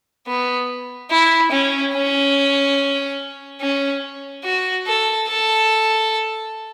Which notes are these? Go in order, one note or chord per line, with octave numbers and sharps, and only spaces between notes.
B3
E4
C#4
C#4
C#4
F#4
A4
A4